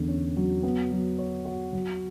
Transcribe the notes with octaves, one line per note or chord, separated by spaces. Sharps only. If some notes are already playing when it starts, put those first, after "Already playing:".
Already playing: E2 D3
C#4
F#3
B3
F#3
C#5
F#4
F#3